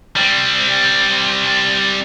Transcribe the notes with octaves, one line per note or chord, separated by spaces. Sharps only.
G3 C4